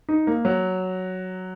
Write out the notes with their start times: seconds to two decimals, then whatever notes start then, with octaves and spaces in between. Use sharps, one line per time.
0.09 D#4
0.27 A#3
0.45 F#3